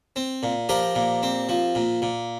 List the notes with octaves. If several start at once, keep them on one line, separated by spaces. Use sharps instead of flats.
C4
A#2
F3 G4 A#4
A#2
C4
F3
A#2
A#2